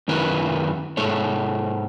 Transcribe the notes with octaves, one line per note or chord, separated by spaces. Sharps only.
F#2 D#3 C#4 E4 A#4 B4
G#2 G#3 A4 C#5